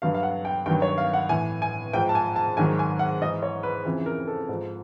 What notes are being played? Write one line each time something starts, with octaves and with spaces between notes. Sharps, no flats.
G2 D3 F#3 F5
F5
F#5
G5
G2 D#3 F#3 G5
C#5
F5
F#5
A2 E3 G#5
G#5
G#2 F3 G5
A5
G#5
A5
G#2 D#3 F#3 G#5
G#5
F#5
G#2 E3 D#5
C#5
B4
F2 C#3 E3
A#4
A4
G#2 F3